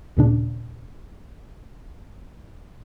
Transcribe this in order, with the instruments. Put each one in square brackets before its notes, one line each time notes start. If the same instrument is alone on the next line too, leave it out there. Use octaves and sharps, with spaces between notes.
[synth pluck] D#2 A#2 C#3 D4